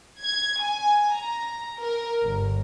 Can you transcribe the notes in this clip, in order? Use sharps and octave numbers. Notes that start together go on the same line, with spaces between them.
G#6
G#5
A#5
A#4
G1